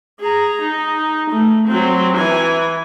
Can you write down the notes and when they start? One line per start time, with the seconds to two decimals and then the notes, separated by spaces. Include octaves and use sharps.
0.20 G#4 A#5
0.61 D#4
1.30 A3
1.67 F#3 C4
2.17 E3 G#5